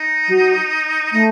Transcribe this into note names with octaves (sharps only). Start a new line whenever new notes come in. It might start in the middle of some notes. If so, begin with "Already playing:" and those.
Already playing: D#4
F#3
A3 D#4